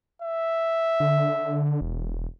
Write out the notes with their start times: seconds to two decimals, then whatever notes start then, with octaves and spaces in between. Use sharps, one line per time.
0.22 E5
1.00 D3
1.81 E1